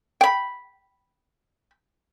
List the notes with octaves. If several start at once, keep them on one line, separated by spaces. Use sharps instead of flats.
G5 B5